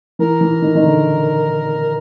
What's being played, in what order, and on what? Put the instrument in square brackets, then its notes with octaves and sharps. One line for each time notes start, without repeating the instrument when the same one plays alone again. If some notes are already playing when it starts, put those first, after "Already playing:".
[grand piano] E3 [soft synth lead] A#4
[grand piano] E3
D#3
D#3
D3